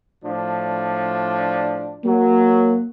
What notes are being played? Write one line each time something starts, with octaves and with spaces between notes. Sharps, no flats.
A2 F3 D4
F#3 A#3